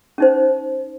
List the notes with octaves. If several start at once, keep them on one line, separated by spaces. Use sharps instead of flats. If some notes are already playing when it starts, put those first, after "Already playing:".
C#4 D#4 C5